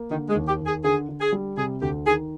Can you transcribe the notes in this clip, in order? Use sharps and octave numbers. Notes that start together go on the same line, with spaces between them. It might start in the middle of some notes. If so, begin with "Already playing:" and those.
Already playing: A#3
D3 D#3
G#3
D#2
G4
D#2
G#4
D3 G#4
D3
G#4
G3
C3 G#4
D2 G4
D#3 G#4